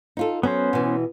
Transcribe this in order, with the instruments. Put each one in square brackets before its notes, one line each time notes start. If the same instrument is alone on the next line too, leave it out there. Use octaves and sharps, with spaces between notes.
[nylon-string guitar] D#4 F4 A4
[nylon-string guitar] F#3 [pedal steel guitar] B3 C#4 C5
[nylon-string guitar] B2 E3